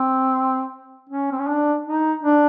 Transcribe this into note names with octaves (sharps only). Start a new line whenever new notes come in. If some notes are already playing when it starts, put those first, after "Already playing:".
Already playing: C4
C#4
C4
C#4
D4
D#4
D4